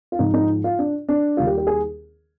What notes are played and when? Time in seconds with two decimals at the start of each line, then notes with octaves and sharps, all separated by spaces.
0.12 F4
0.19 G#2 F3 G#3 D#4
0.34 D#4
0.64 F4
0.79 D4
1.09 D4
1.37 D#2 D#3 G3 F4
1.47 G4
1.58 G4
1.67 G#4